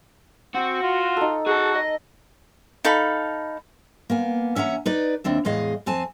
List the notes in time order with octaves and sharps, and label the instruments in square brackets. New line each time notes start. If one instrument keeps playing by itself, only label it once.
[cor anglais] C4 [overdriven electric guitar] F#4
[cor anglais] F4
[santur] D#4 A4
[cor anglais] F#4 [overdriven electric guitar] G#4 A5
[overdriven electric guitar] D#5
[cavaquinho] D#4 A4 F5 B5
[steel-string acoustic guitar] A#3 B3 G#5
E2 C#4 E5 F#5 A#5
D#4 B4 D5
D#2 C4 D4 E5
E2 A2 G#3 G#4 D#5 F5
F2 C4 G#5 A5